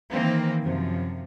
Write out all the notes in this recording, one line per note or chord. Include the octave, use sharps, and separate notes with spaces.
D#3 E3 A#3 C4
F#2 C3 F3